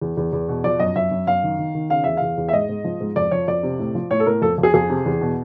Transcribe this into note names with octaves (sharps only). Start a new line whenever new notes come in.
E2
E2
E2
B2
F3 D5
F#2 D#5
F#2 E5
F#2
F#2 F5
D#3
D#3
D#3
C#3 F5
E2 E5
E2 F5
E2
E5
G#2 D#5
G#2
F3
G#2
F2 D5
F3 C#5
F2 D5
C3
A2
F3
A2 C#5
A4
A2 A#4
F2 A4
F2
G#4
F2 G#4
C3
E2
B2